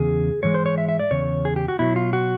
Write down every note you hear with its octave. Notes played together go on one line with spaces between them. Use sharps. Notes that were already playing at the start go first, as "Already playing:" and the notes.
Already playing: E2 C#3 G#4
G#2 E3 G#3 C#5
C5
C#5
E5
E5
D5
E2 C#3 C#5
G#4
G4
F#4
B2 F#3 E4
F4
F#4